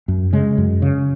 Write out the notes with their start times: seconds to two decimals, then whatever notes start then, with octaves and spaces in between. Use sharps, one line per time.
0.08 F#2
0.33 C#3 G#3
0.58 F#2
0.82 C#3